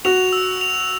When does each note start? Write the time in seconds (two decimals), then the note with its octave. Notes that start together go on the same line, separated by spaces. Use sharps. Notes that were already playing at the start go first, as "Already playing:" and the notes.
0.05 F#4 F7
0.33 E6
0.61 F7